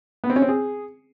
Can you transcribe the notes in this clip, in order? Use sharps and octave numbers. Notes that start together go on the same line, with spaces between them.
B3
C4
C#4
C4
G#4